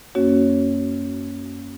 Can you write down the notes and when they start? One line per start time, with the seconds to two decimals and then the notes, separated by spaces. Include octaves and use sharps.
0.15 F#2 A#3 C#4 F#4 C#5